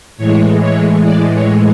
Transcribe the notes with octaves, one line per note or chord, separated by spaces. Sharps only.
A2 E3 G#3 C#5
C#5
D5
C#5